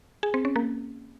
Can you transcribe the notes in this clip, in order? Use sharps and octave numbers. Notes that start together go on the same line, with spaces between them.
G#4
C4
C#4
A#3